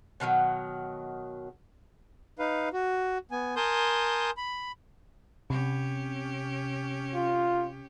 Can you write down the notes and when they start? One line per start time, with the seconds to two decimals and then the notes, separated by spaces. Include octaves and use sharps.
0.20 B2 D#3 F3 F#3
2.39 D#4 B4 F5
2.73 F#4
3.31 B3 G#5
3.56 A#4 G#5 A5 C6 D#6 G6
4.37 B5
5.50 C3 C#4 G4
7.15 F4